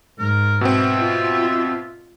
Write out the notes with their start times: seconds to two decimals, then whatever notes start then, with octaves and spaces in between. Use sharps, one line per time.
0.19 G#2 A#4
0.61 B2 B3 C4 E5
0.98 F4